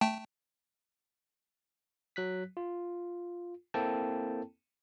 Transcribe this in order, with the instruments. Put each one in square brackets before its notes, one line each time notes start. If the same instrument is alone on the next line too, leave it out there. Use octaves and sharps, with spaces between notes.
[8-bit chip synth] A3 G5 A5
[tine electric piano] F#3 F#6 B6
F4
A#3 C4 E4 A4 G5 A5